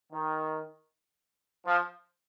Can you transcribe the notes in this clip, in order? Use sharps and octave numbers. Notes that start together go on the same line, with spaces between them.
D#3
F3